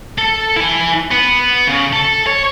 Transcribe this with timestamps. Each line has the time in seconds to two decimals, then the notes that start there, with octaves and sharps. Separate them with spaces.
0.18 A4
0.56 E4 G#5
1.11 B3
1.68 C#3
1.93 A4
2.26 C#5